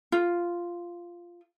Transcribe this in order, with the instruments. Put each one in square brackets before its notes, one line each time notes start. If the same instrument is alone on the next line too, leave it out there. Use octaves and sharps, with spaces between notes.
[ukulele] F4